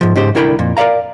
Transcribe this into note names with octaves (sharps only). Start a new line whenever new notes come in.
G#2 F3
G#2 C#3 G4 C5
C2 D3 E4 A#4 G5 B5
F2 A#2
A#4 D5 D#5 F5 A#5